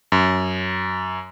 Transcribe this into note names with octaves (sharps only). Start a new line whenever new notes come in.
F#2